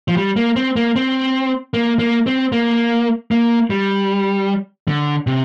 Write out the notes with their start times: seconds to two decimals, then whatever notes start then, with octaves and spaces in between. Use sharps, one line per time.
0.08 F3
0.16 G3
0.36 A#3
0.56 C4
0.76 A#3
0.96 C4
1.74 A#3
1.99 A#3
2.27 C4
2.52 A#3
3.31 A#3
3.70 G3
4.88 D3
5.27 C3